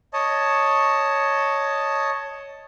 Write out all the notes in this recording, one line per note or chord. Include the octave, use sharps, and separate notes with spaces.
C#5 D#5 A5